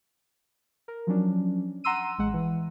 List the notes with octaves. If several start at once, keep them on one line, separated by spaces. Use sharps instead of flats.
A#4
F3 F#3 C#4 D4
F#5 A#5 C6 E6 D#7
A1 G#3 F#5
E3